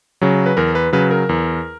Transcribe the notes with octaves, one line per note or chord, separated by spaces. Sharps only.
C#3 F#3
B4
E2 A#4
B4
C#3 F#3 B4
A#4
E2